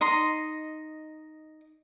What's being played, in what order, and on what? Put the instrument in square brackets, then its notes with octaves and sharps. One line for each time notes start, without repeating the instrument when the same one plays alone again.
[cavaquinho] D#4 D#5 C6